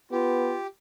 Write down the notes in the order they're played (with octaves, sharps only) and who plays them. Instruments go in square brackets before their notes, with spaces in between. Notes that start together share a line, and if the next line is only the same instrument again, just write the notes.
[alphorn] B3 [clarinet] F4 [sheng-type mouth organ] G4